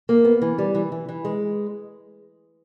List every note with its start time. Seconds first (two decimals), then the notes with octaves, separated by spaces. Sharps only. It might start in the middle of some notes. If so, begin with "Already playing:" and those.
0.09 A#3
0.25 B3
0.42 E3
0.58 G3
0.75 E3
0.92 E3
1.09 E3
1.25 G#3